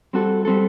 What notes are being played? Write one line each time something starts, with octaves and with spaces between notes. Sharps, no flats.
G3 C4 F#4 A4
G3 C4 F#4 A4